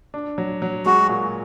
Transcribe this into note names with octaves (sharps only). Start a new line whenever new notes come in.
D4
F#3
F#3
G#3 F#4
A#2